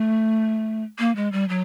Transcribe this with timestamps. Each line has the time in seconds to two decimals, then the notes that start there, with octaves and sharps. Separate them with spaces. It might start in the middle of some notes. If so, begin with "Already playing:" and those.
Already playing: A3
0.99 A#3
1.16 G#3
1.32 G3
1.49 F#3